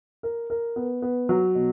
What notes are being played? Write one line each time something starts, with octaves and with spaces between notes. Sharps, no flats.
A#4
A#4
B3
B3
F#3
B2